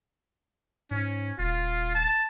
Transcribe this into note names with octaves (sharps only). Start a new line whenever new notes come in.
G#2 C#4
D#1 F4
A5